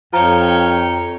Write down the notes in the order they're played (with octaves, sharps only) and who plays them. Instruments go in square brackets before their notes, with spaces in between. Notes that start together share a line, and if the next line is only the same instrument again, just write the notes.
[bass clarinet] F2 [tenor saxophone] F3 [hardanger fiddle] C#5 G5 [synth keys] A#5